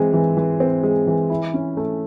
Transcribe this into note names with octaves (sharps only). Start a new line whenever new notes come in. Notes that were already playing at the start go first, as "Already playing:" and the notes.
Already playing: E3 G#3 C4
E3
E3
C4
G#3
E3
E4
C#4
A3